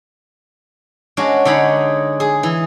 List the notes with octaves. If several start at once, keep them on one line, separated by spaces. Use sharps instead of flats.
G#3 C#4 D4 F#4
D3 G#3 D#4 C#5 B5
G#4
E3